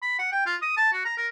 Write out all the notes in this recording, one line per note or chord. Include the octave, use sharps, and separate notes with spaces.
B5
F#5
G5
F4
D#6
A5
F#4
A#5
A#4